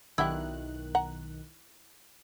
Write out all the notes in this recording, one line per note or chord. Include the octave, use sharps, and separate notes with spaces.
B1 D#3 D4 E4 F#4 G4 F#6
F#5 A#5